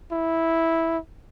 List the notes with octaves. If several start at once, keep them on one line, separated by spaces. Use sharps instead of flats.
E4